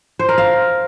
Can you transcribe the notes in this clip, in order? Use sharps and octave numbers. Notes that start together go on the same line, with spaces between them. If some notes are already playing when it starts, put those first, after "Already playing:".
C5
A#4
F5